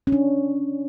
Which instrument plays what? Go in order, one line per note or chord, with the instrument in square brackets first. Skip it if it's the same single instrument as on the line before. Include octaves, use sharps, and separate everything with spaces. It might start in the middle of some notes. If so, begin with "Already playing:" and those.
[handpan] C#4
D4